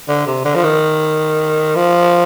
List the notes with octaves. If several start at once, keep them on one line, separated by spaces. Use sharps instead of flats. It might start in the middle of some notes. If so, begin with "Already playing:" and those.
D3
C3
D3
F3
D#3
F3